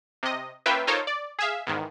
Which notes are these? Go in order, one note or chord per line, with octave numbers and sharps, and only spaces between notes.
C3 D#5
A#3 C#4 F4 B4 E5 G5
D#4 F4 A4 A#4 C5 C#5
D5
G#4 E5 F5
E2 G#2 D#3